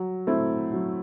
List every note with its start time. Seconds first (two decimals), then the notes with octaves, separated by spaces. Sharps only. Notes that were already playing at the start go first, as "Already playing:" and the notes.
Already playing: F#3
0.27 A3 C4 E4
0.72 F#3